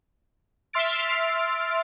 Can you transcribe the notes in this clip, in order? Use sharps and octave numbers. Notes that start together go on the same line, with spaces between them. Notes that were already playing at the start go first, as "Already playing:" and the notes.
E5 C6 F6 A6 D7